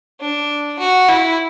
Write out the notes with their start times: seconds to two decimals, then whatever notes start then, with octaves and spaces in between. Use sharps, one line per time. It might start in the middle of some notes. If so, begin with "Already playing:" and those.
0.20 D4
0.79 F#4
1.08 E4